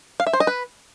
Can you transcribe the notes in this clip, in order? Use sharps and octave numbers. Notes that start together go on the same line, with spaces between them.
F5
E5
C5
D#5
B4